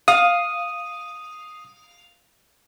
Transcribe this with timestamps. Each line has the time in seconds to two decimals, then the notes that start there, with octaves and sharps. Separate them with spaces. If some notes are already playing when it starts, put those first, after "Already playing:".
0.08 F5 D#6